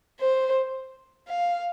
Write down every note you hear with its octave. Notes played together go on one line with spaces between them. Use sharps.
C5
F5